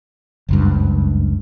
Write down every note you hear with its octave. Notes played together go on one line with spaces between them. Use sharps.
F#1 C#2 G2